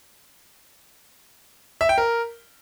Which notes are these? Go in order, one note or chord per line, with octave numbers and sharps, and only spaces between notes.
E5
G5
A#4